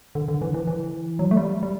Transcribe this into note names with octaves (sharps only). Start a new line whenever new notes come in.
D3
D3
E3
E3
E3
F#3
A3
G3
G3